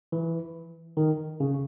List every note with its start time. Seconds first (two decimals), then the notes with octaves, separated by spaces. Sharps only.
0.12 E3
0.97 D#3
1.40 C#3